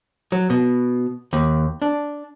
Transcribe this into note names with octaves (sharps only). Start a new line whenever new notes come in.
F#3
B2
D#2
D4